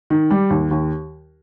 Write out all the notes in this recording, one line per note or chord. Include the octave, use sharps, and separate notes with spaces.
D#3
G3
D#2
D#2